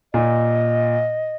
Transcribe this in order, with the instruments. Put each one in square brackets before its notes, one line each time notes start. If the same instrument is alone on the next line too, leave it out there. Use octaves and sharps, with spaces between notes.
[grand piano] A#2 [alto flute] D#5